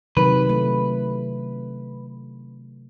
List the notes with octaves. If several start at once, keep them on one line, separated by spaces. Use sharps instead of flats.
C3 D#3 F#3 B4
A3